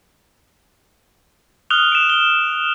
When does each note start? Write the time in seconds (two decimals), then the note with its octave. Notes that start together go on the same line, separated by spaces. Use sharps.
1.70 D#6 F6 F#6 F7 G7
1.92 D7 E7
2.10 G7